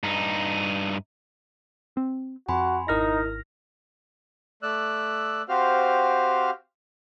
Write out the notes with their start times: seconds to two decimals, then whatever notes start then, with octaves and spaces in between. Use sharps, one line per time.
0.03 G2 D#4
1.97 C4
2.49 F2 F#4 G#5 B5 C6
2.88 G#1 D#4 E4 A#4 F6 A#6
4.63 A3 D5 E6 F#6
5.49 C4 F#4 G4 C5 F5 F6